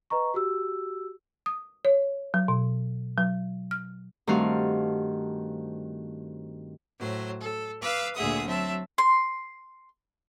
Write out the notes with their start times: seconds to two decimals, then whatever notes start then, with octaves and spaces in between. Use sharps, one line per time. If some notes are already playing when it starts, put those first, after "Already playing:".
0.10 B4 D#5 A#5 C#6
0.34 F#4 G4 E6
1.46 D#6
1.85 C#5
2.34 F#3
2.48 B2
3.18 F#3
3.71 F6
4.27 G2 D#3 A3 C4 F#4 F5
6.99 A2 F#3 C5
7.41 A4
7.80 B4 F5 D6 E6
8.15 D2 A#2 G#4 E5 F#5 D#6
8.45 F#3 C4 E5 A5
8.98 C6